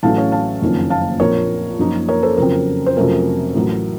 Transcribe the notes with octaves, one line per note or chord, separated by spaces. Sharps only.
A1 A2 F#3 A3 C#4 F5 A5
C#5 F5
F5 A5
F#1 F2 D#3 A#3 C#4
F5 A5
A#1 A#2 F3 C4 A#4 C#5
F#2 F3 A#3 D#4
A#4 C#5
A4 C5
F2 C#3 F#3 C4 A#4
C5
F2 C3 F#3 A3 C#4 A#4
A1 A2 F#3